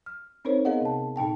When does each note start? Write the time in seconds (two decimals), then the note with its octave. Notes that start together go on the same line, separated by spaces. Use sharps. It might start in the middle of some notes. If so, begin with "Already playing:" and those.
0.06 F6
0.45 C4 C#4 D#4 A#4 C5 C#5
0.65 B3 G#4 A#4 D#5 F5 F#5
0.81 C3 A5
1.16 A#2 D#4 G5 A5